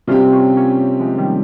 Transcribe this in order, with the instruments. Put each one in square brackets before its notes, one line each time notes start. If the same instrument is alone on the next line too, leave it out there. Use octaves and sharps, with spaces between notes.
[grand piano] C3 G3 C4 G4 [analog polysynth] C#4 F4
[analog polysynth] C#4 F4
A#3 C#4
F3 G#3
D#3 G3